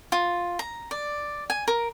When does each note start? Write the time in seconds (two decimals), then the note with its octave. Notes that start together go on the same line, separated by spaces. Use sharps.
0.12 F4
0.59 A#5
0.91 D5
1.50 G#5
1.68 A#4